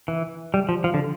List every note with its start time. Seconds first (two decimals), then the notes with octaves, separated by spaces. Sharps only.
0.08 E3
0.54 G3
0.69 F3
0.84 F3
0.94 D3